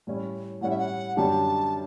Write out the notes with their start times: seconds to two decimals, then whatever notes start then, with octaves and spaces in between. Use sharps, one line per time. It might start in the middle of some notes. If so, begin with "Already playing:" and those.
0.07 A2 G3 C#4 E4
0.61 A2 G3 C#4 E4 F#5
0.70 E5
0.78 F#5
1.17 F#2 D3 G3 D4 G4 A5